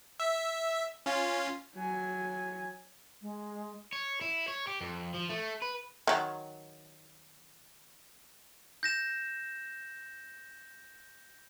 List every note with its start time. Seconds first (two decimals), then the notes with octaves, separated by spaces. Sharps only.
0.20 E5
1.06 C#4 F4
1.74 F#3 G#5
3.22 G#3
3.92 C#5
4.21 E4
4.48 C#5
4.67 G4
4.81 F2
5.14 F3
5.29 A3
5.62 B4
6.07 D#3 F#3
8.83 G6 A#6 E7